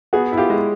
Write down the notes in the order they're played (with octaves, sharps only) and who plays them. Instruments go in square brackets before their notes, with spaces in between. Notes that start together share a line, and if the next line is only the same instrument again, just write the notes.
[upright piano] B3 [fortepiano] F#4 G#4
[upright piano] E4
[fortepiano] F4 G4
[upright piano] G#3